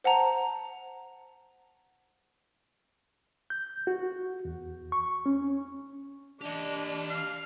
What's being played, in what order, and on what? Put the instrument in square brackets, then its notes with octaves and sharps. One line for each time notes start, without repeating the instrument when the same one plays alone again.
[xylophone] C5 F#5 A5 A#5
[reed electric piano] G6
F#4
E2
C#6
C#4
[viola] D4 [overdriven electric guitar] G4 D#5
[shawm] F5